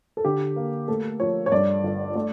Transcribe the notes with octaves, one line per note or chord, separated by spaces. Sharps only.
A4
D3 G4
A#3
A3 A4
F3 C#5
C#5
G2 D5
G1
A3 D5